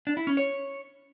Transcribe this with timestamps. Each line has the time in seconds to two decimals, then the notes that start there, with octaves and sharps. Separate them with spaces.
0.07 D4
0.17 E4
0.27 C#4
0.37 C#5